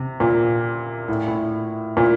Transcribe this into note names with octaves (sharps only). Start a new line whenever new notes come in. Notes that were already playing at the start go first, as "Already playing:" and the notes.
Already playing: C3
A#2
A2
A2
A#2